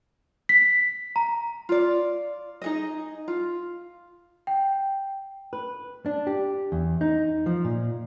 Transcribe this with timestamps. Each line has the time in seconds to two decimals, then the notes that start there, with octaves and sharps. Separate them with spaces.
0.49 B6
1.16 A#5
1.69 F4 D5
2.62 D#4 G#4 D#5
3.28 F4
4.47 G5
5.53 B4
6.06 D4
6.27 G4
6.72 E2
7.01 D#4
7.46 F3
7.65 A#2